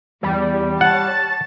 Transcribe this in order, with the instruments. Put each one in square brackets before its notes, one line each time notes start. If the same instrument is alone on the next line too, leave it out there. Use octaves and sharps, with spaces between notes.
[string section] E2 [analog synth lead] G3
[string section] C#5 A5 [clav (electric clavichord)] F#5 [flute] A6